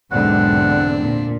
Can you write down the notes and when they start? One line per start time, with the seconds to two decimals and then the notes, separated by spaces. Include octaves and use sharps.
0.12 B1 E2 G#2 D3 C4 D4 F#5
1.01 A#2